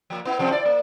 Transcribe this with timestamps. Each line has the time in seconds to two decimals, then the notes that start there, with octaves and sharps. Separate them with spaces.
0.10 F3 A#3
0.25 B3 E4
0.39 C3 F3 C4
0.52 E4 D5
0.65 A#3